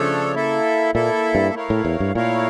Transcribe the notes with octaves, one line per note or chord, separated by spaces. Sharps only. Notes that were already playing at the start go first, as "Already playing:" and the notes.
Already playing: C#3 F3 A3 D4 A4 C#5
A#3 E4 A4 E5
A#2 A#3 E4 A4 E5
G2
A3 E4 A#4 C#5 F5
A2
E2
G2
A#2 A3 E4 A#4 C#5 F5